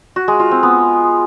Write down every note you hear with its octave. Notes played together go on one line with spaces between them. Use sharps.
F#4
G#3
F4
C4
B3